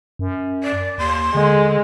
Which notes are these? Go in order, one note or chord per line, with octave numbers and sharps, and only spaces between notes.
F#2
D5
D#2 C6
D3 G#3